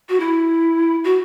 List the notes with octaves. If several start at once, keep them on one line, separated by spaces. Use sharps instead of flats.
F#4
E4
F#4